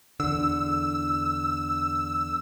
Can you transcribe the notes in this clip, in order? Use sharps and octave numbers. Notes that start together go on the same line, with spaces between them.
E2 D3 E6